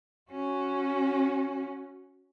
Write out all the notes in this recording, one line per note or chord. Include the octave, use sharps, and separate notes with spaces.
C#4 F#4